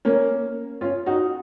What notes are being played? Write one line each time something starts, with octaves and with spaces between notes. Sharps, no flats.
A#3 C#4
C#4 F4
D#4 F#4